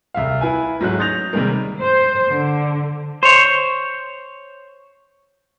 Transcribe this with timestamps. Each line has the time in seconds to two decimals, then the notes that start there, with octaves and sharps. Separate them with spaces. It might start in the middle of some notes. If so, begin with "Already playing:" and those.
0.14 C2 E5 F5
0.41 E4 B4 G#5
0.81 G#2 F#3 A3 C#4 F#6
0.99 D#6 G6 A6 A#6 F7
1.33 C3 D#3 G3 G#3 A#3
1.81 C5
2.30 D3
3.23 C5 C#5